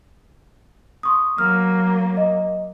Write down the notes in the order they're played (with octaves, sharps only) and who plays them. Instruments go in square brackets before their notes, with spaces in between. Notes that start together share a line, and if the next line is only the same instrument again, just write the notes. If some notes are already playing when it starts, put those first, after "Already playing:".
[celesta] C6 C#6 D#6
[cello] F#3 A#3 [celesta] F6
[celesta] D#5